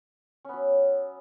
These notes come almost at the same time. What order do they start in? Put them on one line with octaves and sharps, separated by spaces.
C#4 B3 F#3